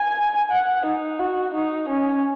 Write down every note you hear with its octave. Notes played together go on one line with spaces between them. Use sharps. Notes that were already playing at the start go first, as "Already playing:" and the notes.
Already playing: G#5
F#5
D#4
F#4
D#4
C#4